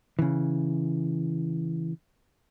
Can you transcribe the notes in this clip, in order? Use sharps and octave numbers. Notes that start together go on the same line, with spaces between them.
C#3 E3